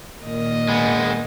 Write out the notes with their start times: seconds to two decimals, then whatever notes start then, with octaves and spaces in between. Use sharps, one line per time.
0.23 A#2 D#3 D#5
0.69 G#3 B3